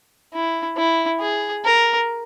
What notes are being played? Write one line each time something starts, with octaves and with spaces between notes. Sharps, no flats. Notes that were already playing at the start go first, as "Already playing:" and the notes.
E4
E4
G#4
A#4